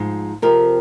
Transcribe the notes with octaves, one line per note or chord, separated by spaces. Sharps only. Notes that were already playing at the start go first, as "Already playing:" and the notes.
Already playing: G#2 F3
F2 C3 F3 G4 A#4